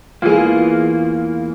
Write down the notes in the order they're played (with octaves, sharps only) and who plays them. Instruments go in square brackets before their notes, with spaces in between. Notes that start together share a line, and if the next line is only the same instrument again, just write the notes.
[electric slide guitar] E2 E3 A#3 [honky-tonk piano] F4 G#4